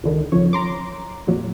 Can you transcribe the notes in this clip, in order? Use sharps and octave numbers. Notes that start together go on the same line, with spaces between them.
C#2 D3 D#3
B1 F#2 C#3 F3 C#5
A#5 C6 D6
F2 A#2 F#3